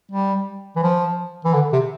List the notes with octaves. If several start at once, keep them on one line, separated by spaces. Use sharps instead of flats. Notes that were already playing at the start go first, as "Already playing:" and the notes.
G3
E3
F3
E3
D3
C3